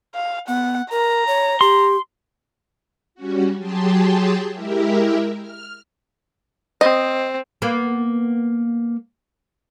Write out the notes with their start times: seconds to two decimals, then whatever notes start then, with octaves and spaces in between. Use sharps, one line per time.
0.15 F5
0.48 B3 F#5
0.91 A#4 A#5
1.27 C#5
1.61 G4 C6
3.15 G3 C#4 F#4
3.58 F#3 G4 G#4 G5 A5 C6
4.53 G#3 E4 G4 A#4 E5
5.40 F6
6.81 C4 D#5
7.62 A#3 B3